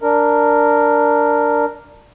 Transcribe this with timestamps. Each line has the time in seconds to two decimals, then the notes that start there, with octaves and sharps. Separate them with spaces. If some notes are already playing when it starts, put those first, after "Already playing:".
0.02 D4 A#4